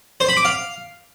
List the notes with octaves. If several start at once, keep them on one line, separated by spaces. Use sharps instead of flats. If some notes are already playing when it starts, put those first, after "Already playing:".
C5
B5
D6
F5